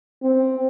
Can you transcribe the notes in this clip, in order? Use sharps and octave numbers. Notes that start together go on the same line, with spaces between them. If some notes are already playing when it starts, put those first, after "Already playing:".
C4